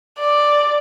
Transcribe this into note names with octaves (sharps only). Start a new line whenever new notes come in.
D5